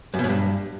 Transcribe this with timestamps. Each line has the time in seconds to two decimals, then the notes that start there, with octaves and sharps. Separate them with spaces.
0.14 F#2
0.19 B2
0.24 F#2
0.29 G2